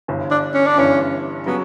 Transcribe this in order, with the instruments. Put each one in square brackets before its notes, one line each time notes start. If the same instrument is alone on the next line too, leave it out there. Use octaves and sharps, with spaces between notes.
[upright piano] G1 G2 E3
[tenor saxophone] D4
C#4
D4
[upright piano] G1 G2 E3 [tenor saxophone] C#4
[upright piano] C#3 F#3 [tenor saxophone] B3